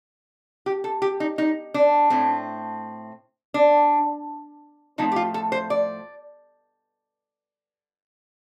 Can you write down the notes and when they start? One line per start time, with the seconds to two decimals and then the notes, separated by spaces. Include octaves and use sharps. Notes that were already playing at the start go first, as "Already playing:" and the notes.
0.66 G4
0.84 A4
1.02 G4
1.20 D#4
1.38 D#4
1.74 D4
2.10 A2 A3 C4
3.54 D4
4.98 A2 F3 A3 C4 D#4
5.12 G4
5.16 F4
5.34 A4
5.52 C5
5.70 D5